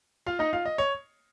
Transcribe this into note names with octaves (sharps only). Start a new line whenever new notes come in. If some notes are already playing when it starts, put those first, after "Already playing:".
F4 F5
D#4 D#5
F4 F5
D#5
C#5